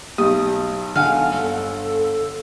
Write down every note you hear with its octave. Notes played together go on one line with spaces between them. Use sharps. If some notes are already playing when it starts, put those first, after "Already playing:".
B1 G4 D#6
D3 F5 F#5 G#5
G1 A4